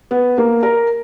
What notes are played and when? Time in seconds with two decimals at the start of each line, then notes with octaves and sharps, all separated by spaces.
0.11 B3
0.38 A#3
0.63 A#4